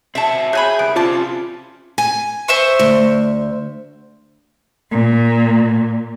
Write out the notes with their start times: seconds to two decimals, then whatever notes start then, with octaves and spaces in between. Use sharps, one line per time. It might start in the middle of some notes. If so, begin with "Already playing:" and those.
0.15 C4 F#4 E5 A5
0.53 F#3 G#4 G#5 B5 G6
0.79 C2 B3 D7
0.96 C3 C#4 F4 C5 D5 A5
1.98 G#5
2.48 C5 E5 C#6
2.79 D2
4.90 A#2